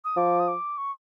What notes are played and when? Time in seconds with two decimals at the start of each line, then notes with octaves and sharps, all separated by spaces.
0.05 D#6
0.17 F3 D6
0.39 D#6
0.48 D6
0.78 C#6